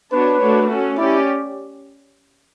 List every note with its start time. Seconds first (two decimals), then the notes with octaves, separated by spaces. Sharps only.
0.11 B3 D4 F#4 B4 C#5
0.39 A3 D4 F#4 C#5
0.68 C#4 F#4 A4
0.97 C#4 E4 G4 D5